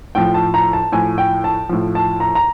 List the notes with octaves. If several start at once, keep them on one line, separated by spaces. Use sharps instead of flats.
A2 F3 G5
A5
A#5
A5
A2 F3 G#5
G5
A5
A2 F3
A5
A#5
A#5